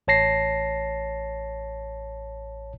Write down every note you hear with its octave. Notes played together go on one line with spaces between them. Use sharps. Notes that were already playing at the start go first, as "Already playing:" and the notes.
A1 C#5 A5 A#6 C7